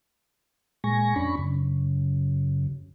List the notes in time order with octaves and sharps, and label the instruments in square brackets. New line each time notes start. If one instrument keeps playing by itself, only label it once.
[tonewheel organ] A#2 G#3 G#5 C#6 A#6
F2 C#4 D4 B5 C#6
F#2 C#3